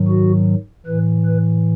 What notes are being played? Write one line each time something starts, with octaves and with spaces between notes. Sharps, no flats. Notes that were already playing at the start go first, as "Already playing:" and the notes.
Already playing: G#2 D#3 F#3
F#4
A2 E3 B4
B4